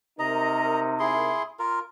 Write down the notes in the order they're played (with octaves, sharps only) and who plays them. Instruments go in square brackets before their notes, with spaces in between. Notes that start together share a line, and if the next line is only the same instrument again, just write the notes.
[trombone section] C3 D#4 A#4 [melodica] D#5 A#5
[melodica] E4 G#4 C6
F4 A#4